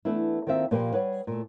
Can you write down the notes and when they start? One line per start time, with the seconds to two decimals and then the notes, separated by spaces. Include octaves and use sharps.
0.05 E3 A3 B3 D4 E4
0.47 D#3 A#3 C4 F4 E5
0.71 A#2 F3 A#3 G4 B4 C5
0.93 G3 G#4 B4 C#5 F#5
1.27 A#2 A3